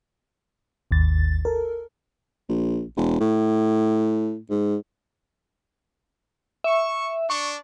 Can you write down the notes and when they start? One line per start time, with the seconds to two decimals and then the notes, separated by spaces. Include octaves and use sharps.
0.91 G#1 D#2 A6
1.45 A4 A#4
2.49 A#1
2.97 E1
3.20 A2
4.50 G#2
6.64 E5 C#6
7.30 D4 C#6